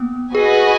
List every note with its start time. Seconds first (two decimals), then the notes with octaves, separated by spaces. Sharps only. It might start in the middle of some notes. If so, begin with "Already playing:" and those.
Already playing: A#3 B3
0.35 F#4 G#4 B4 D#5 G#5